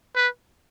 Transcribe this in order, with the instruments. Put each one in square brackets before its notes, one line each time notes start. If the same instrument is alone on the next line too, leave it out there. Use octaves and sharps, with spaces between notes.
[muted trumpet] B4